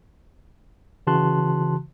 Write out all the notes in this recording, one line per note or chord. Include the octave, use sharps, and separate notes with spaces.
C#3 E3 F#4 A5 C6 F#6